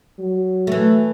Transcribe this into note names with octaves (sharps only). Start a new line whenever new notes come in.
F#3
E3 A3